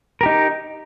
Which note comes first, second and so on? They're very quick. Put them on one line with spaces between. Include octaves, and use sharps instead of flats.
A#4 G4 D#4